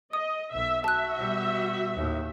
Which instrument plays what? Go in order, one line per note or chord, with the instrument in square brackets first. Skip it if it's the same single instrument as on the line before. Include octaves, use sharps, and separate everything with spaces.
[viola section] D#5 [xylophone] D#6
[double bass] B1 [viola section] E5
[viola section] F#4 E5 [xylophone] A5 F#6
[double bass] B2 G3
D#2 A2